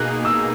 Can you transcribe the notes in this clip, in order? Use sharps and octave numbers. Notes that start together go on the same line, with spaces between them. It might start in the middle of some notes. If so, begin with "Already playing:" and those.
Already playing: B2 A#3 D#4 G#4 F#6
E6